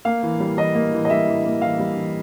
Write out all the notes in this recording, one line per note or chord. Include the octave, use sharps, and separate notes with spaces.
A#3 F5
E3
G3
E3 D#5
A#3
E3
D#5
G3 E5
E3
A#3
E3 F5
G3
E3